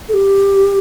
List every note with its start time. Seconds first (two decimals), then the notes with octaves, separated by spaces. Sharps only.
0.09 A4
0.14 G4